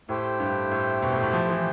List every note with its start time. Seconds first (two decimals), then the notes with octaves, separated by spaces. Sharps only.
0.09 A2 A3 E4 G4 C5 G5
0.40 G2
0.71 A2
1.02 B2
1.13 A2
1.23 B2
1.33 F3
1.49 E3